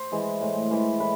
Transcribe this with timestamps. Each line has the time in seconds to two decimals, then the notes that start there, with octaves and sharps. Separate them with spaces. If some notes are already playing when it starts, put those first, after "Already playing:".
Already playing: C5
0.12 E3 G#3
0.41 A2
0.71 E3 G#3
1.00 A2 B4